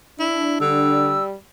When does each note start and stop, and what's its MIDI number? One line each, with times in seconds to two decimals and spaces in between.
0.20 1.14 62
0.20 0.60 64
0.61 1.18 50
0.61 1.35 55
0.61 1.24 88